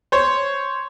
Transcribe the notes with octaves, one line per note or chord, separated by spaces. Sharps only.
C5 C#5